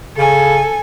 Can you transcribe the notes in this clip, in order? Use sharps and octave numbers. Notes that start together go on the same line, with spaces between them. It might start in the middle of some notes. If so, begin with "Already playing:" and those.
C#3 A4 G#5